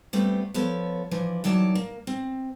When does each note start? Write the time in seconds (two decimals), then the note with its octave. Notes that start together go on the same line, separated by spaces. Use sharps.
0.13 G3 A3 B3 C4
0.54 F3 B3 A4 C#5
1.11 E3 F3 D4
1.44 D#3 E3 F#3 D5 A5
1.75 A#3
2.07 C4